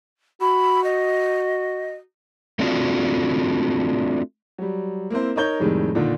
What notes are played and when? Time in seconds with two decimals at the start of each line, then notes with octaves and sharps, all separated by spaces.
0.41 F#4 B5
0.84 D#5
2.59 A3 C4 D4 F4 F#4
4.58 F#3 G3
5.10 A#3 C4 E4 C5
5.36 D#4 A#4 C#5 G6 G7
5.60 F2 A2 C3 D#3 G3 G#3
5.95 A#2 D3 D#3